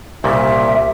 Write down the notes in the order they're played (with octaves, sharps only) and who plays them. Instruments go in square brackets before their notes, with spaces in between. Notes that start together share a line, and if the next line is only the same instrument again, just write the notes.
[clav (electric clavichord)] C2 A#2 C#3 [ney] E5